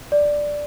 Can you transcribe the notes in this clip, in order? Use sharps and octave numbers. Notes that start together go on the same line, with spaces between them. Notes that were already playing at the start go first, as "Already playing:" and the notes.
D5